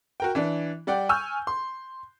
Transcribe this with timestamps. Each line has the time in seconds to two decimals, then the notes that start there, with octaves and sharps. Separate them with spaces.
0.20 F#4 A#4 G5
0.35 E3 D4
0.87 G3 D5 F#5 G5
1.09 G#5 C#6 E6 F6 G6
1.47 C6